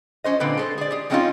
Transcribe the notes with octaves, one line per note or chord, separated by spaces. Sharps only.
F3 C#4 C5 D#5
A#2 D3 C4 B4
G#3 A4 C5
G#4 D5
G4 G#4
F3 G#3 C4 C#4 D#4 F4